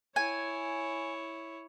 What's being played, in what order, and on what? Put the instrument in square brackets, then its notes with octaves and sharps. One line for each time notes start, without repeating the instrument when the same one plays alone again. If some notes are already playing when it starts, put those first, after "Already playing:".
[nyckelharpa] E4 C#5 [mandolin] G#5